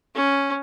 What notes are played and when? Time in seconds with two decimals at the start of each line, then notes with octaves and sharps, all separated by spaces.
0.15 C#4